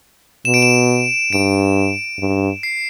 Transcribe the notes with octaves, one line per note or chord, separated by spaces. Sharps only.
B2 E7
D7
E7
G2 D7
G2
C7